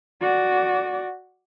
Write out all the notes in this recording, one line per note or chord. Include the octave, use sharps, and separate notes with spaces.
F#4 D5